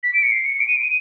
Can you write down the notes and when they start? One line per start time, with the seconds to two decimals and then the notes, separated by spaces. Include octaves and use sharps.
0.03 B6
0.14 D7
0.23 C#7
0.32 C7
0.45 C#7
0.60 D7
0.68 D#7
0.76 D7
0.83 D#7